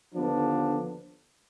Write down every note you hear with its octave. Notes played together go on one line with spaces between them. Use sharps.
D#2 D3 F3 B3 D4